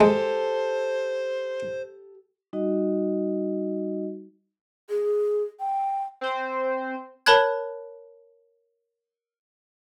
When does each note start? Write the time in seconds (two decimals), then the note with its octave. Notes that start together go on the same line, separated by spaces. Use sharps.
0.01 G#3 G4 A4 C5
2.53 G3 D#4 F#4 D#5
4.90 G#4
5.60 G5
6.21 C4 C5
7.26 A#4 C#5 A5 B5 F#6 G#6